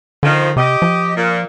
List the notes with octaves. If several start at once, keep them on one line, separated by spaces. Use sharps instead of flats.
D3 D#3 F3
C3 G4 D#5
F3
A#2